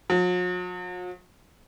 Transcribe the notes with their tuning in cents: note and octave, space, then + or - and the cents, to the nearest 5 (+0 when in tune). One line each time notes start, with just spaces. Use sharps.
F#3 -45